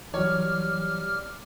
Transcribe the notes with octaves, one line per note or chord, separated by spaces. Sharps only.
E3 F#3 G3 G4 C#5 F6